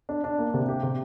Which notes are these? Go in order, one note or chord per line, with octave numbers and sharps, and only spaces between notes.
D4
D4
A#3
C3
G4
C3